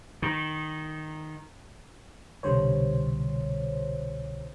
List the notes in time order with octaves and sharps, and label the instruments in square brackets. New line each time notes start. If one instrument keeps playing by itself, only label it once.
[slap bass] D#3
[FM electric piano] C2 B2 D3 G3 C5 C#5